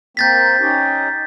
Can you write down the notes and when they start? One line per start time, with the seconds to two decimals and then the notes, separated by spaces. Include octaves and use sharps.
0.17 A#3 C4 G6 A6 B6
0.60 C#4 D#4 G4